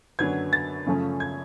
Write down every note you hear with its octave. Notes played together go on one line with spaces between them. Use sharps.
F#2 D3 F#3 B3 G#6
A6
F#2 C#3 F3 A3 C#4
G#6